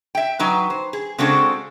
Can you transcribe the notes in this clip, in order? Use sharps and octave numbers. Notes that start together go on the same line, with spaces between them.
E5 G5
F#3 D#4 B4
C5
G#4
C#3 G#3 C4 D4 F#4 A4